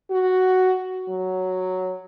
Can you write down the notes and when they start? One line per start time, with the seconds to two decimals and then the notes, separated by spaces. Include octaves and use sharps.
0.11 F#4
1.09 F#3